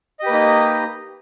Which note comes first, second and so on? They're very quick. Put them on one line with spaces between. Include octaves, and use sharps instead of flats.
D#5 G4 B4 A#3 D#4